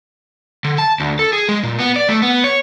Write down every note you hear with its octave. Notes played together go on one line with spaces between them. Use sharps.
D3
A5
D2
A4
G#4
G#3
A#2
B3
D5
A3
B3
C#5